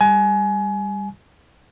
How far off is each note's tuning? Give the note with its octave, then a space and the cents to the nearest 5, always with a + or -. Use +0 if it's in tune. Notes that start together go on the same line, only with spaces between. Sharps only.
G3 +15 G#5 +25